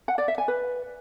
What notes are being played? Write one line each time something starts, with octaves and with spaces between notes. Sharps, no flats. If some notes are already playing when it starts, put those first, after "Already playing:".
F#5
D5
E5
G#5
B4